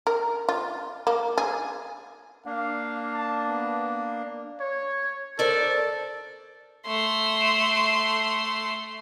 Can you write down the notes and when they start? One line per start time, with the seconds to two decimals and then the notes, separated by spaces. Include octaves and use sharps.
0.07 A#4
0.49 F4
1.07 A#3
1.38 G#4
2.46 A#3 D4 F5
3.14 A5
3.49 B3
4.61 C#5
5.39 A4 A#4 C5 D5
6.87 A3 C6